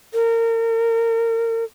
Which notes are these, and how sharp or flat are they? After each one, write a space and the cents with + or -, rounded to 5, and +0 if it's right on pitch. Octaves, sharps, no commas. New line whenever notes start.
A#4 -30